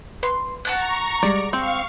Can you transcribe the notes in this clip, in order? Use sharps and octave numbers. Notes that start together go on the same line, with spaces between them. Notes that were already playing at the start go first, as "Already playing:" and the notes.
B4 C6
F#4 A5 A#5 C#6 F#6
G3 G#3 D5
C4 F5 C#6